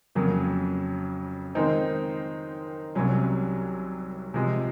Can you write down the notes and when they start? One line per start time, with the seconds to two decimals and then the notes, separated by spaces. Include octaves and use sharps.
0.15 F2 C#3 F#3 A#3
1.55 D#3 G#3 C4 D#4
2.95 C2 C3 F#3 C#4
4.34 C3 F3 G#3